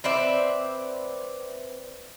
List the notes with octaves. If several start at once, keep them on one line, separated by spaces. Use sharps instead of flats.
C4 B4 D5 E5